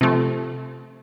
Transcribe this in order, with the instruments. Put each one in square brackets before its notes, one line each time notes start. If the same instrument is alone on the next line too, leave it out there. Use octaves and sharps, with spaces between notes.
[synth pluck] C3 F3 A3